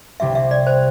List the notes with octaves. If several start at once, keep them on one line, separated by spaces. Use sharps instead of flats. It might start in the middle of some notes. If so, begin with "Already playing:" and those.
C2 C3 G3 C4 E5
E5
D5
C5